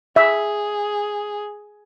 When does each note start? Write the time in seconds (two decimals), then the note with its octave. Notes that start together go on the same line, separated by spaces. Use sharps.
0.16 G#4 E5